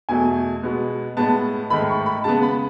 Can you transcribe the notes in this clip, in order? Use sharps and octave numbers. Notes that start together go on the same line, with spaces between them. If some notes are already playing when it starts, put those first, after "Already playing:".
E2 B2 A3 G#5
B2 G#3 B3
A2 G#3 B3 A5
G#2 D#3 A3 B5
C#6
B5
C#3 G#3 B3 A5
B5